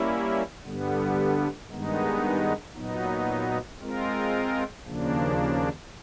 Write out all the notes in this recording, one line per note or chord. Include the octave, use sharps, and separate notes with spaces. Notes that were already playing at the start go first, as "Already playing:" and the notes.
Already playing: G3 A#3 C#4 E4
G2 D3 G3 B3
G2 D#3 G#3 B3 D#4
A#2 F#3 B3 D#4
G#3 C4 F4 A#4
D#2 C#3 F3 A#3 D4